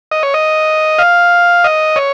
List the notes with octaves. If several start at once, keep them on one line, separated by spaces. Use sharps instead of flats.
D#5
C#5
D#5
F5
D#5
C#5